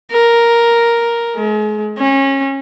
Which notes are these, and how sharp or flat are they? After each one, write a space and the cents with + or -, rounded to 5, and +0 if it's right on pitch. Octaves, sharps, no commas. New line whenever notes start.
A#4 +5
G#3 +35
C#4 -25